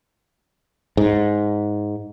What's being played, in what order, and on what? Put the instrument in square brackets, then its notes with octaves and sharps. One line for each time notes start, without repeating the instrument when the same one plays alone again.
[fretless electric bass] G#2